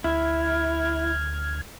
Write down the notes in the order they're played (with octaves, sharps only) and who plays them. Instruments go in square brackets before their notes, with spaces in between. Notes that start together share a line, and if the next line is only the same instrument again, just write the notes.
[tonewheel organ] D2 F6 G#6 [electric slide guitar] E4